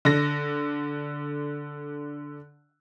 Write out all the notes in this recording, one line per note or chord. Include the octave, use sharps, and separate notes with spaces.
D3 A#6